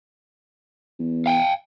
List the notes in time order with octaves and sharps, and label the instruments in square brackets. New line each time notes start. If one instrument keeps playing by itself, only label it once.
[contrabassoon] E2
[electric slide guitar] F5 G5 G#5